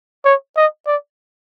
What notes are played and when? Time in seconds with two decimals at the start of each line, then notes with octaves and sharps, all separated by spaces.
0.25 C#5
0.57 D#5
0.87 D5